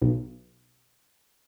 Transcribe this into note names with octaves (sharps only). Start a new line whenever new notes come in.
B1